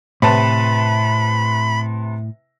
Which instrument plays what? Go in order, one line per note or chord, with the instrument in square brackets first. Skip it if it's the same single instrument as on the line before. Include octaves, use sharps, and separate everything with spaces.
[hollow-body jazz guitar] A2 [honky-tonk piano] C3 B4 A5 [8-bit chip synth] B5